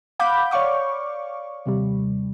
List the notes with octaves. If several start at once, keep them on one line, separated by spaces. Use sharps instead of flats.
F5 F#5 B5 D6 G6
C#5 D5 F5 C#6 D6
D#2 C3 G3